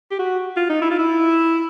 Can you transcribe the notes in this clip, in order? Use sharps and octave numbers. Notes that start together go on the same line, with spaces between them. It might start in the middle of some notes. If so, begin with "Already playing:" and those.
G4
F#4
F4
D#4
E4
F4
E4